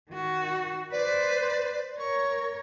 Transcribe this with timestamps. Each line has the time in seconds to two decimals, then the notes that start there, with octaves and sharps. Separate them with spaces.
0.11 D#3 F#4
0.92 B4 C5 D5
2.00 A#4 C#5 C#6